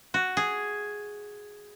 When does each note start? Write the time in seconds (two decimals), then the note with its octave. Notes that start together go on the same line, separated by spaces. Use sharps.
0.14 F#4
0.37 G#4